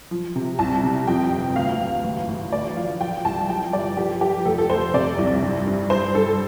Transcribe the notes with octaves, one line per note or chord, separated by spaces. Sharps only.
F3
C3
C2 A5
C3
F2 G5
G1
D2 F5
D2
A1
A1
D2 D5
F3 F5
F3 G5
C2 A5
F3 G5
G1 D5
F3 G4
F3 G4
F1 A4
A4
F1 C5
C3 D5
C2
G2
G2
G2 C5
G2 A4